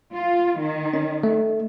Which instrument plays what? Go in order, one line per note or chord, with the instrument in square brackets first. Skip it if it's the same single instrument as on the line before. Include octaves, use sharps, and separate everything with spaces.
[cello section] F4
D#3
[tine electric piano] C#4
A3